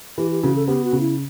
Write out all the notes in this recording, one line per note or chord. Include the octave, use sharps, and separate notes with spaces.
E3 G4
G4
C#3 F#4
A4
B3 G4
F#4
C#3
E4